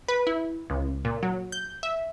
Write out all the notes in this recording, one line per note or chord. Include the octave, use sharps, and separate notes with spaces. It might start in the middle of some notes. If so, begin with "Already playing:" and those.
B4
E4
C#2
A#2
F#3
G6
E5